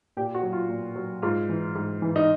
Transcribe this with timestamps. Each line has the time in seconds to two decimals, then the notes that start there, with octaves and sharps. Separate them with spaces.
0.17 A#2 G4
0.35 F#4
0.43 F#3
0.53 F4
0.69 A#2
0.96 F#3
1.22 G#2 F4
1.49 E3
1.75 G#2
2.02 E3
2.16 D#4